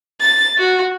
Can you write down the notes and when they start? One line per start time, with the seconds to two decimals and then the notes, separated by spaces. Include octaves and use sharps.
0.21 A6
0.58 F#4